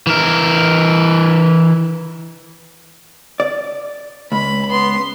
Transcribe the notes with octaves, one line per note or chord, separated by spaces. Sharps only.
E3 A#4
D5
C#2 B5
B3 C6